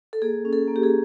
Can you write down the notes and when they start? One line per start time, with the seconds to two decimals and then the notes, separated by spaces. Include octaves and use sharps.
0.13 A4
0.22 A#3 G#4
0.45 C#4
0.53 A4
0.68 A#3
0.76 G4
0.83 G#4